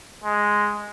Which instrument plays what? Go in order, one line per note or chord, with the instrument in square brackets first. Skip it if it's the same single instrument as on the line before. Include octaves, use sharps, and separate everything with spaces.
[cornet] G#3